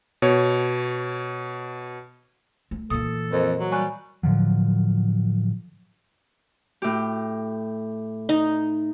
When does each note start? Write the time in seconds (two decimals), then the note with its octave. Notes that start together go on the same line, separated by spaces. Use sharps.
0.22 B2 C#5
2.71 A3
2.90 A#2 E3 A4 D#6
3.32 F2 A#4 C5 D#5
3.59 F#3
3.72 G3 G#5 C#6 F#6
4.23 A2 D3 F3 F#3
6.82 A2 G4
8.29 D#4